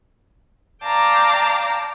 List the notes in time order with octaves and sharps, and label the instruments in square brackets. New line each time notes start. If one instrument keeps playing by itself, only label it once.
[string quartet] D5 F5 G5 A5 A#5